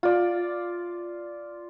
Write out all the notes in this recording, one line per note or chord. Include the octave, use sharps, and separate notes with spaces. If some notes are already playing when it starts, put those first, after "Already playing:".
F4 D5